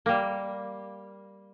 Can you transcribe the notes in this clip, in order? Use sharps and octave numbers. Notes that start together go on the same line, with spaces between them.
G3 A#3